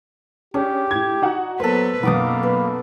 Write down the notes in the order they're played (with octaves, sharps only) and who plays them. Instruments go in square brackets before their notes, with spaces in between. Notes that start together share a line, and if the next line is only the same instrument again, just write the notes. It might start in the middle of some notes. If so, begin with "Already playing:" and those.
[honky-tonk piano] C#4 G#4 [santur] D4 [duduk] G4
[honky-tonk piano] A2 G#6
D#4 F#4 F#5
[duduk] F#3 [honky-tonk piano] A#3 [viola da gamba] B3 B4 [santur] A4 C5
[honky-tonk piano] B1 F#2 [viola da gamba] B2 [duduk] A#3 [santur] B3 D6 D#6
[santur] B4